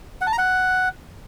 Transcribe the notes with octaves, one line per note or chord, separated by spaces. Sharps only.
F#5
A5
A#5
F#5